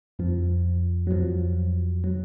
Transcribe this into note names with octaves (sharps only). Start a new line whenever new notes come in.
F2 F3
F#3
F2 F3
F#3